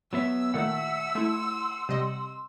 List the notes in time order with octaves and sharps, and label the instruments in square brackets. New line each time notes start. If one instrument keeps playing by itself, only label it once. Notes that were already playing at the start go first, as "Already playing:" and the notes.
[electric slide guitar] F#3 B3 E5 [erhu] E6
[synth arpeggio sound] A#2 D#3 A3 [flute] E5 [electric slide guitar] F#5
[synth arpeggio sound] A3 E4 [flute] C6
[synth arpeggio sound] C3 G3 D#5